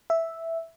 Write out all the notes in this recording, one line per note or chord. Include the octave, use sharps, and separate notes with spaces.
E5